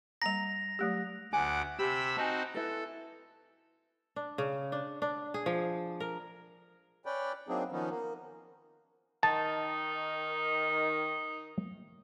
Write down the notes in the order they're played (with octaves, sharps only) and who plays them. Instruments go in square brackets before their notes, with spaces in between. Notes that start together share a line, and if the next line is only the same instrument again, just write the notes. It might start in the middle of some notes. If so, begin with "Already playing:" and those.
[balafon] G3 A#3 A#5 [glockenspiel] A#6 F7
[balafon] F#3 A3 G4
[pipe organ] D2 F#5 D6 [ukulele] G#5
[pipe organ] C3 B5 E6 [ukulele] G4
[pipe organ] C4 D#4 F#4 [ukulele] G#5 A5
[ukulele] E4 B4 [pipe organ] A4
[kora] D4
C#3
D4
D4
G#4
F3
A#4
[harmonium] C#4 B4 D5 G5
F#3 A#3 C4 D4 D#4 G#4
D#3 F3 B3 C#4 D#4
A#3
[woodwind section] D#3 [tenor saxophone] D#4 [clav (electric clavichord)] A5